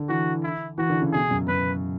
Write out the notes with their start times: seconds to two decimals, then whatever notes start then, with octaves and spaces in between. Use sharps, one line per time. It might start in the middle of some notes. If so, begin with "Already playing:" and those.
Already playing: D3
0.09 E3 F#4
0.43 E4
0.78 E3 F#4
0.90 D3
1.02 C#3
1.13 B2 G#4
1.31 F#2
1.48 F#2 B4